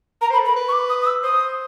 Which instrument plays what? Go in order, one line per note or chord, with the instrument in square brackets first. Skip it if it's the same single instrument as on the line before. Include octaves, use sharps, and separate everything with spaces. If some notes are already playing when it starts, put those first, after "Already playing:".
[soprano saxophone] A#4 [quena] A#5
[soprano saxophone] C5
[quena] B5
[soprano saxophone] A4
[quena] B5
[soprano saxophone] A#4
B4
[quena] C#6
D6
D#6
D#6
E6
[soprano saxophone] C5 [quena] D#6